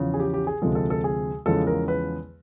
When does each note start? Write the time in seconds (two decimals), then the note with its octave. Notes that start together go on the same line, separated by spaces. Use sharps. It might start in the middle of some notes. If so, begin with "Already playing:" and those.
Already playing: E2 C#3 F3
0.14 G#4
0.19 G4
0.34 G4
0.47 G#4
0.62 D2 C3 F3 G#3 A4
0.75 A4
0.90 A4
1.04 G#4
1.46 E2 C#3 F3 G#3 A4
1.67 A#4
1.88 B4